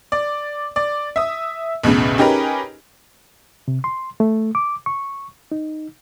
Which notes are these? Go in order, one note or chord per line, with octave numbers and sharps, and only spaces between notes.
D5
D5
E5 D#6
B1 E2 A2 C#3
C#4 D#4 G4 G#4 A#4 B4
C3
C6
A3
D6
C#6
D#4